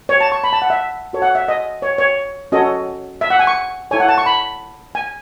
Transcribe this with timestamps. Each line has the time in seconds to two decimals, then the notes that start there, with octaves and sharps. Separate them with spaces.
0.09 C#5
0.21 A5
0.32 C#6
0.44 B5
0.53 A5
0.62 F#5
0.70 E5
1.13 F#4 A4 C#5
1.22 F#5
1.35 E5
1.48 D#5
1.82 C#5
1.98 C#5
2.52 C#4 F#4 A4 C#5 D#5
3.21 E5
3.30 F#5
3.39 G#5
3.47 C#6
3.91 E4 A4 C#5 G#5
4.00 F#5
4.09 A5
4.18 C#6
4.26 B5
4.95 G#5